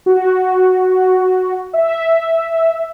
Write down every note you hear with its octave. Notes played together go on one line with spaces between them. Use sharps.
F#4
E5